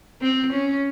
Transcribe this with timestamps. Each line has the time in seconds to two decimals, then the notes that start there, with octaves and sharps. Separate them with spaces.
0.21 C4
0.53 C#4